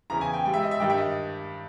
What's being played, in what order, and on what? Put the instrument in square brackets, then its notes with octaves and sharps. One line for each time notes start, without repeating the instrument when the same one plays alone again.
[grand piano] E2 C#3 E3 A#5
G#5
G5
G#2 G3 G5
E5
D#5
E5
G2 D#3 G3 G5
E5
D#5